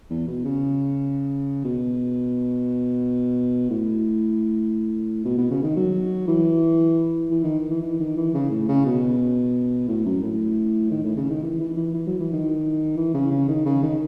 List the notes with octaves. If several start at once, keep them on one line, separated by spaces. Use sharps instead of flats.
E2
B2
C#3
B2
A2
B2
B2
C#3
D#3
F#3
E3
E3
D#3
E3
E3
D#3
E3
C#3
A2
C#3
B2
A2
F#2
A2
D#3
A2
C#3
D#3
E3
E3
E3
E3
F#3
E3
D#3
E3
C#3
C#3
D#3
C#3
D#3